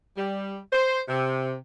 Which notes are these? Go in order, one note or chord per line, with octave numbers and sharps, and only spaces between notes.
G3
C5
C3